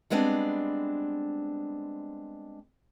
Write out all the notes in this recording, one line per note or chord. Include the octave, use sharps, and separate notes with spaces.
G3 G#3 B3 C4 D4